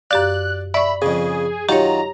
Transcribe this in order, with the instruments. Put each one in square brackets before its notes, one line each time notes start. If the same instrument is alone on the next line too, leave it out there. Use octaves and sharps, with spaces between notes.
[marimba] F#2 G4 F5 [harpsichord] D5 [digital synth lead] F#6
[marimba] D5 C#6 [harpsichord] E5 [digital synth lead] B5
[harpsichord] F2 C#3 [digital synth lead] G#4
[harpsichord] D#3 F#3 F4 [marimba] G4 C#5 [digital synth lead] A#5